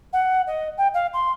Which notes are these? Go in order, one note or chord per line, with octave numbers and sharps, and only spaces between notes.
F#5
D#5
G5
F5
C6